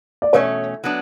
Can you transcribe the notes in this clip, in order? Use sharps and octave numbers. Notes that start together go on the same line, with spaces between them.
D5
E2 B2 A3 C#4 C#5
F#3 B3 D4